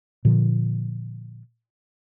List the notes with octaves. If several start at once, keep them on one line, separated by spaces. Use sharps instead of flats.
A#2 D3 F3